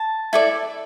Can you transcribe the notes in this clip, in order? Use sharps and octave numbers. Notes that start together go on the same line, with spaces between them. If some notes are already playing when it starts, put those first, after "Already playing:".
Already playing: A5
E4 A4 D5